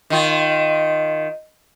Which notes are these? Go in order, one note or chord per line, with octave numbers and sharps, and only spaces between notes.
D#3 F4